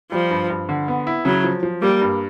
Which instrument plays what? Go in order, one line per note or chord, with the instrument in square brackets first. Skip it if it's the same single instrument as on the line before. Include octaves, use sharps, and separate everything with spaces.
[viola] F3 [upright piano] G3
[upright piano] G2
G2
D3
B3
E4
[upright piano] C#3 [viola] F#3
[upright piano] F3
F3
[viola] G3 [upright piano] A#3
[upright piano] G2